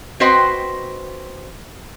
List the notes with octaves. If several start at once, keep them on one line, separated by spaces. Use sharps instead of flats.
C4 F#4 B4 C5 D#5 G5